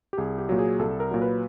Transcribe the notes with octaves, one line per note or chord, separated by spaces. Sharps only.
G4
C2 G#4
G4
A#2 F#3
G#4
C2 A4
A#4
A#2 F#3
B4